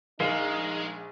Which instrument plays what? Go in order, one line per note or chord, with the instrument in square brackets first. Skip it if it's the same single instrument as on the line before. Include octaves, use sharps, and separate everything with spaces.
[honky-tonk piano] A#1 [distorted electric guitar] G#3 [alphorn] D#4 [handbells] A#4 F5